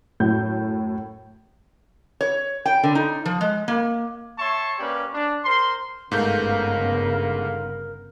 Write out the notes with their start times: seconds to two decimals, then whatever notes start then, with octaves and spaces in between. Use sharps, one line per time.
0.20 F#2 A2 G6
2.21 C#5
2.66 G5
2.83 D3
2.95 D#4
3.26 F3
3.41 G#3
3.68 A#3
4.39 C#5 E5 A5 C6 C#6
4.79 A#3 C#4 G4 B4 D5
5.14 D4
5.45 A#4 C5 C6
6.12 G1 G#2 C#3 A3 B3 A#4 F5 G6